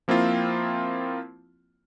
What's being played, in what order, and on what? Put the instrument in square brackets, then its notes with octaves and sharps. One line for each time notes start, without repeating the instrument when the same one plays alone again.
[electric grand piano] F3 A#3 C4 E4 F4